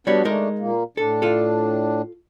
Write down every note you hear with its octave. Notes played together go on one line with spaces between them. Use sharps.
G3 B3 D4 F#4 C#5
G#3 A3 D4 D#4 A#4
A#2 A#3
A2 D4 A4
F4 A4